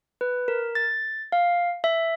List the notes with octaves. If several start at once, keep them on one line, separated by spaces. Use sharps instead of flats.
B4
A#4
A6
F5
E5